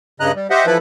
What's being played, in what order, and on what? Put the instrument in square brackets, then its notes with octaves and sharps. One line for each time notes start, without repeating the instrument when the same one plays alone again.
[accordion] G2 C#3 D#5 A#5 F#6
G3
G4 C5 D#5 E5 F#5
E3 F3 E4 A4 B4 B5